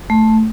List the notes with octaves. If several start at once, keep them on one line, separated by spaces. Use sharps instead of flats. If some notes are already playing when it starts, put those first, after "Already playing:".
A3